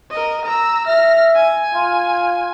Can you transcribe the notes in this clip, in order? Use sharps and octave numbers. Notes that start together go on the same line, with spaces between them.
A#4 D#5
A#5 E6
E5 F6 A#6
G#5
F4